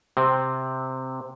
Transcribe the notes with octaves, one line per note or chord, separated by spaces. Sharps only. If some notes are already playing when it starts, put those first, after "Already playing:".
C3 C4